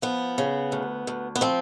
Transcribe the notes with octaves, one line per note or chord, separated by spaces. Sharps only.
F3 B3
C#3
D2
D2
B3
F3 C4